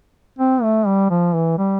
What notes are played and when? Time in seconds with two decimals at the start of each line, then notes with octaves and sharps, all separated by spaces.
0.39 C4
0.63 A3
0.87 G3
1.10 F3
1.35 E3
1.58 G3